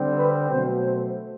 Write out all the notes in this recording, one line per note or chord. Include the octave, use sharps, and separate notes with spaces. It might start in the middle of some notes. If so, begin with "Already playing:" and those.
Already playing: D3 G3 C4
B4
B2 F#3 A3 C5
C5